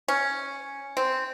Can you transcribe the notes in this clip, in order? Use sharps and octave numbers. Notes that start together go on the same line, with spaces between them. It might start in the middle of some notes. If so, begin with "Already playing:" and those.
C#4
C4